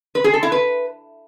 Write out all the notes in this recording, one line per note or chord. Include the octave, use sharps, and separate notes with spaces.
B4
G#4
A4
E4
B4